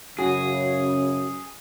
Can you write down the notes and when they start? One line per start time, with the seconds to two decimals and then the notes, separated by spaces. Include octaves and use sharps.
0.19 F#2 C#3 F#4 G#4